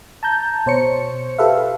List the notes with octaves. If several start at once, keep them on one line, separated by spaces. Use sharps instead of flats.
A5 A#5 G6
B2 C5 C#5 C#7
F4 G4 A4 B4 E5 F5